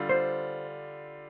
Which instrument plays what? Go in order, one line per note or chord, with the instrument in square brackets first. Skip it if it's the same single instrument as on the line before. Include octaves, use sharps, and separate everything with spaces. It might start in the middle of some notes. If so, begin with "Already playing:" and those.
Already playing: [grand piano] D3 G3 F4
[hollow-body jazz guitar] C5